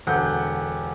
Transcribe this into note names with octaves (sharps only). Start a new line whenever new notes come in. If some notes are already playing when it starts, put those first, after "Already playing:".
E1 D3 F#5 F#6 G6